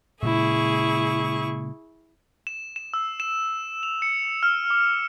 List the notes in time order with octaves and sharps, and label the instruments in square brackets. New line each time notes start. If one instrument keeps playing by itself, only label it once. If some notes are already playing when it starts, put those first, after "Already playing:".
[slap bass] A#2 C#3 G#3 [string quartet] E4 G#4 C#6
[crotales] E7
E7
E6
E7
F7
C#7
F6
D6